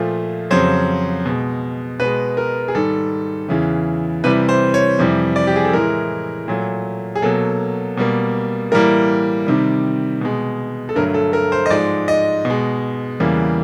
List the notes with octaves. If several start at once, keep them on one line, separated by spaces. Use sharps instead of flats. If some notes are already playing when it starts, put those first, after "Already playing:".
Already playing: A#2 F3 A3
F2 C#3 F#3 C5
B2 G#3
B2 G#3 B4
A#4
G#4
G#2 D#3 G3 A4
E2 C#3 E3
C3 E3 G3 B4
C5
C#5
F2 C3 E3 G3
D5
G4
G#4
A4
A2 E3 G#3 A#4
A#2 F#3 A3
G#4
B2 F#3 A#3 A4
B2 G3 A#3
A2 E3 G3 A#3 A#4
C3 D#3 G3
B2 G#3
A4
G2 D3 F#3 A3 A#4
A4
A#4
C5
D#5
G#2 F3 G#3 D5
D#5
B2
G#3
E2 C#3 E3 G3 A#3